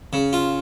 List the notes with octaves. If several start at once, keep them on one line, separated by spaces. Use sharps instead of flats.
C#3
F4